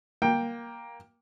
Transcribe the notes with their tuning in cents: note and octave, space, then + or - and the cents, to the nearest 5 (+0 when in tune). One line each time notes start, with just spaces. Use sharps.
A#3 +10 G5 +10